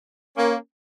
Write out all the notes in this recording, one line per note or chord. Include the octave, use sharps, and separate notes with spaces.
A#3 C#4